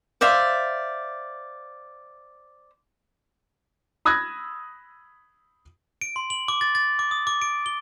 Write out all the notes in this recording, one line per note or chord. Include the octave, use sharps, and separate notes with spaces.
C5 D5 E5 F5
B5 D#6 E6 F#6 G#6 A#6
D7
C6
F#7
D6
A6
A6
D6
D#6
D6
D7
G7